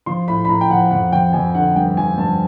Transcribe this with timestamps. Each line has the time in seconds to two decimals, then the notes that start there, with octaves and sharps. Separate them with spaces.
0.06 F3 C6
0.28 A2 B5
0.45 B5
0.49 A2 A#5
0.61 G5
0.70 F3 F#5
0.91 F2 F#5
1.12 F3 G5
1.33 F2 G#5
1.55 D3 F#5
1.76 G2 G5
1.97 F3 G#5
2.18 G2 A5